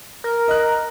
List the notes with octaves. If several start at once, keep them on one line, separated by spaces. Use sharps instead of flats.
A#4
D#5 F#6